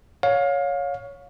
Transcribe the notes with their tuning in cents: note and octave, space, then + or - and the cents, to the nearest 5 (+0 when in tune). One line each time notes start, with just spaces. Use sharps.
C#5 +10 F5 +25